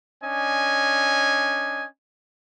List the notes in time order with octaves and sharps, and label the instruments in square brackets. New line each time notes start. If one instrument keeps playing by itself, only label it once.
[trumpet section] C#4 D4 D#5 G#5